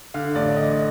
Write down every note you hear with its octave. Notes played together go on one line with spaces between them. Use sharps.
D3 F5
A1 D5
D3 D#5